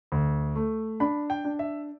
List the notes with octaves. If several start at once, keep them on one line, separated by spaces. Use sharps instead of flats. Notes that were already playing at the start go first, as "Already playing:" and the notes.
D2
A3
D4 B5
G5
D4
E5